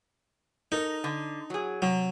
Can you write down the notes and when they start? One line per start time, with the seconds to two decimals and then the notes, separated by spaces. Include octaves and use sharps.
0.72 D#4 A4 A#4
1.04 D3
1.50 F#3 G#4
1.82 C3 F#3